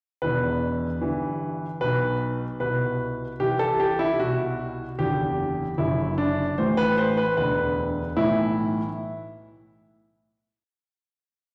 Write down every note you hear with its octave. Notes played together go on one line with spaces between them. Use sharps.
E1 E2 B2 B4
G1 G2 E3
B1 B2 B4
C2 B2 B4
C2 C3 E3 G4
A4
G4
E4
C2 B2 F#4
F#1 E2 D3 G4
F#1 F#2 D3 E4
D4
A1 A2 E3 C5
B4
C5
B4
E1 D2 D3 B4
B1 A2 E3 E4